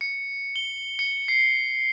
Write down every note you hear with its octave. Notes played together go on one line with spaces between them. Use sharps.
C#7
G7
C#7
C7